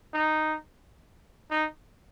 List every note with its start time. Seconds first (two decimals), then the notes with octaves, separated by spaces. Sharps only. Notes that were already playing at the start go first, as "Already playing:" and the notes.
0.14 D#4
1.51 D#4